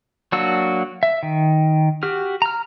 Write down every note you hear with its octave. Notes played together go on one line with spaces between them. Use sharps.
F#3 A#3 D4 F#4 E6
E5
D#3
F#4 G4 F6
A#5 F6